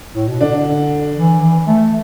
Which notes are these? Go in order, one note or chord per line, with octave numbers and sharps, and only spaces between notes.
A2
B2
D3 D4
E3
E3
A3